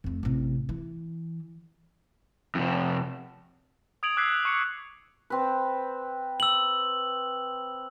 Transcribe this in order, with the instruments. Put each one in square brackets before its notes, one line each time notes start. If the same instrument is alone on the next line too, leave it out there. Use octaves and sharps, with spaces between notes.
[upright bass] F2 A3
A1 C3
E3
[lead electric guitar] F2 C3
[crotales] D#6 G#6 D7 F7 F#7
D6 E6 F#6 G#6 B6 C7
C#6 C#7
[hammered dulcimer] C4 B4
[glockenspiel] E6 F#7